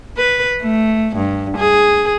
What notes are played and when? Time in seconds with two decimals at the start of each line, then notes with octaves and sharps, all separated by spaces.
0.17 B4
0.62 A3
1.15 G2
1.57 G#4